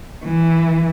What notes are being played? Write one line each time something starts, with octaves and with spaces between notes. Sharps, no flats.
E3